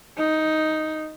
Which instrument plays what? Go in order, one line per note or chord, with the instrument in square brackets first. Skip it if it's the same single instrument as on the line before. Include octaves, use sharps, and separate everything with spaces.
[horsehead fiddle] D#4